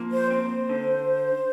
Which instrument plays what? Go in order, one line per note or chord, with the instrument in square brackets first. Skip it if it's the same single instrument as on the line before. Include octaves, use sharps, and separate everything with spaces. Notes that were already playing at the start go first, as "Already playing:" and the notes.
Already playing: [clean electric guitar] F3 A#3
[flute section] C5
[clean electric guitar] C4 [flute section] C5
[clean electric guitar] D3